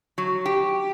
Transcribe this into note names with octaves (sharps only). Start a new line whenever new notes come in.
F#3
G4